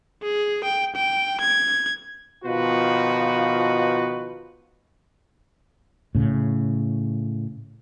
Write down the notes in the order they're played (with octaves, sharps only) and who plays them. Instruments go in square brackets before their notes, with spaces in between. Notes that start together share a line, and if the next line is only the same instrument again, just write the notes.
[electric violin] G#4
G5
G5
G#6
[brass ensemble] B2 D#3 F3 F4 F#4 B4
[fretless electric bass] A2 C#3